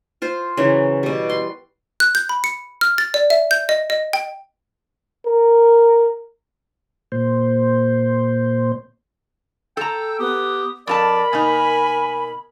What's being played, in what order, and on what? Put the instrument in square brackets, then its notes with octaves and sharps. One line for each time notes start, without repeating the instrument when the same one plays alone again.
[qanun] F4 C5
C#3 E3 F#3
B2 G3
C6
[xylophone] F#6
G6
B5
C#7
F6
A6
D5
E5
G6
D#5
D#5
G5
[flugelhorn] A#4
[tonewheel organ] A#2 C5
[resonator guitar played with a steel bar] A4 A#5 [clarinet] G5 [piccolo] E6
[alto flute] B3 [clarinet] G4 [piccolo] D#6
[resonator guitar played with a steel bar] F2 F#4 A5 [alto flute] A#4 [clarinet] D5 [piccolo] B5
[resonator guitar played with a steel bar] B2 A#3 D#4 [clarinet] G#5